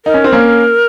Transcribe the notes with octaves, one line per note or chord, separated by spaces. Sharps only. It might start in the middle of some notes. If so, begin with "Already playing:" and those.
D#4 A#4
C#4
C4
A#3 C#4